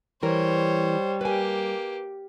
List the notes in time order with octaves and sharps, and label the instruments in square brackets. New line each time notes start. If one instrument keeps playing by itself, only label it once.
[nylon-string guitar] E3 A#4 [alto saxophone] G3 [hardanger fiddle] C5 C#5
[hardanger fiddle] A#3 G4 [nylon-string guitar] B4 G#5